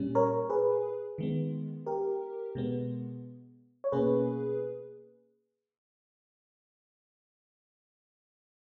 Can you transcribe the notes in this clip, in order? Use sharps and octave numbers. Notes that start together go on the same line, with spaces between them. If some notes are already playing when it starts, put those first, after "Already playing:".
Already playing: A#2 G3 C#4
A#4 C#5
G#4 B4
D#3 G#3 B3
G4 A#4
B2 G#3 B3
C#5
B2 A#3 C#4 G#4 B4